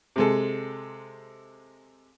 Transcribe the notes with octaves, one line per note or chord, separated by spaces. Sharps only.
C3 G#3 A4